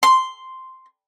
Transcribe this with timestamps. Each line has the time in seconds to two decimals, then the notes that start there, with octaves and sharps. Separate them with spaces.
0.03 C6